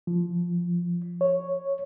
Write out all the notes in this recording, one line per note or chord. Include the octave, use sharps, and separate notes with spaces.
F3
C#5